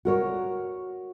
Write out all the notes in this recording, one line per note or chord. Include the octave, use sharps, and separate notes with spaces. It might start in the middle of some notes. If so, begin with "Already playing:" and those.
F#4 A#4 C#5